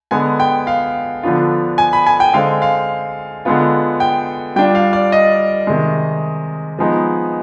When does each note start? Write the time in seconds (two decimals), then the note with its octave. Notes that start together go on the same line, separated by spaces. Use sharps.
0.11 D3 G#3 B3 G#5
0.40 G5
0.67 F5
1.23 D3 F3 B3 D4 F4
1.78 G#5
1.93 B5
2.06 G#5
2.20 G5
2.33 D3 G#3 C4 F5
2.62 F5
3.45 D3 G#3 B3 F4
4.00 G5
4.56 G3 D4 F4 G5
4.75 F5
4.93 D5
5.12 D#5
5.67 C3 D#3 G#3
6.79 F3 G#3 B3 D#4